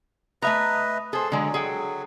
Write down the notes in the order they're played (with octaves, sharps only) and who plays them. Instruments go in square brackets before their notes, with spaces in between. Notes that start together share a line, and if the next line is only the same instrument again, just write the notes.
[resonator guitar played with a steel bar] A3 E5 A#5 [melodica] B4 D#5
[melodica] G#4 [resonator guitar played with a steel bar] A4 C5
[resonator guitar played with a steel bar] D3 G#3 [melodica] F#3
[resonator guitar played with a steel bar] G#4 A4 G5